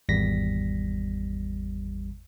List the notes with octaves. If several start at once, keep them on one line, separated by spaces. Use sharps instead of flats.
G#1 E2 G3 A#6 B6